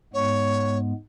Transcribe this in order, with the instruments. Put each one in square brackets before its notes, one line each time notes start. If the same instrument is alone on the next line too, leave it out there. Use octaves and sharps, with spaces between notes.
[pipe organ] G#2 G#3 B3 [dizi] C#5